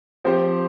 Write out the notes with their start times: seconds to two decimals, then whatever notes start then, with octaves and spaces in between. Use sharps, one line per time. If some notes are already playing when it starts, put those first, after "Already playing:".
0.24 F3 C4 G4 C5